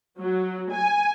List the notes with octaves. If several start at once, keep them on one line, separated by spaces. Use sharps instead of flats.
F#3
G#5